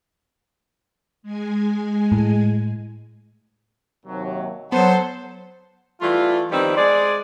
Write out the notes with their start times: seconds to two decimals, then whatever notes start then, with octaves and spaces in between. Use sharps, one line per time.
1.23 G#3 G#5
2.12 A2
4.06 D#2 C3 F#3
4.72 F#3 B3 A4 C5 F#5
6.01 E3 G3 A3 F4
6.52 D#3 F3 G3 B3 C4 D#4
6.76 G#3 G#4 C5 D5